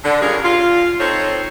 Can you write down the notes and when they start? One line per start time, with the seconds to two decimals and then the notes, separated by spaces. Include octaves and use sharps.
0.04 D3
0.21 G3 C#4 F4 G#4 A#4 C#5
0.43 F4
1.00 C4 D#4 A4 C5 C#5